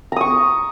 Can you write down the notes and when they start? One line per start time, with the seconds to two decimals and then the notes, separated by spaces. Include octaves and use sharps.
0.12 A#5
0.16 D#6
0.21 C#6